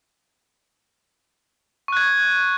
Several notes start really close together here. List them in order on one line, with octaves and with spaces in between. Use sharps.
C#6 F#6 G#6